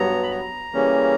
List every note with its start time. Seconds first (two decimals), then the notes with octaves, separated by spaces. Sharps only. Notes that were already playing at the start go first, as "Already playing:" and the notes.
Already playing: G2 F#3 B3 A#5
0.23 B5
0.31 A#5
0.73 C#3 E3 G3 A#3 C#4